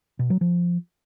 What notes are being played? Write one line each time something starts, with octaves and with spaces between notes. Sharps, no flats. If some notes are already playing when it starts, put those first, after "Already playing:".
B2
F#3
F3